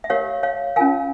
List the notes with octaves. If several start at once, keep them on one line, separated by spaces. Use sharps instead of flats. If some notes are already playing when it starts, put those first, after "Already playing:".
E5
G4 A#4 C#5 F5
C#5 F5
C#4 F4 A#4 F5 G#5